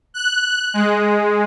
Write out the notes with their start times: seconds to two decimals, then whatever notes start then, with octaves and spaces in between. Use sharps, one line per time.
0.14 F#6
0.74 G#3